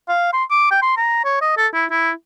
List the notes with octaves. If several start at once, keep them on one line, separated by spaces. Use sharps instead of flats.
F5
C6
D6
G5
C6
A#5
C#5
D#5
A4
E4
E4